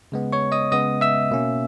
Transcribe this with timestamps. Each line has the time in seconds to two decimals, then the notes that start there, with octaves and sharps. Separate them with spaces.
0.12 C#3 G#3 B3
0.33 C#5 C#6
0.52 D#5 D#6
0.72 C#3 G#3 B3 D#5 D#6
1.01 E5 E6
1.31 B2 A#3 C#4